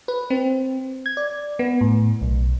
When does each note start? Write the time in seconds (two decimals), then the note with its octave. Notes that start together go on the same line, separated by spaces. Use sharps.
0.08 B4
0.30 C4
1.06 G#6
1.17 D5
1.59 B3
1.81 A2
2.21 B1